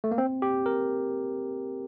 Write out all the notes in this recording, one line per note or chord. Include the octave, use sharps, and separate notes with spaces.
A3
A#3
C4
G4
A#4